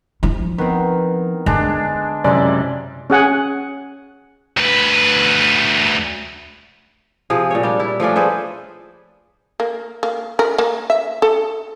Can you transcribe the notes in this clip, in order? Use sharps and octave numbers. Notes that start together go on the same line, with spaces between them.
F3 E4
D#3 B3 C4
D3 G#3 D4
F#2 C3 G#3 C4 E4 D5
C#4 G#4 F#5 G#5
D2 B4
C3 F3 G#4
A#2 C#5
G3 D4
E4
F3 A3 C#4 D4
G#4 A4 B4 C5
A#3
A#3
A#4
A#3
E5
A4